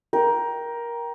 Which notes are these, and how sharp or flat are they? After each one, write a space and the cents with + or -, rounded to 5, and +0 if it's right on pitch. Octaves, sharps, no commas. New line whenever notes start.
A#4 +15 G5 +0